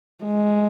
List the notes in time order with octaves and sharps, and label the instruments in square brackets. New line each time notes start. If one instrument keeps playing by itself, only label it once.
[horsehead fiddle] G#3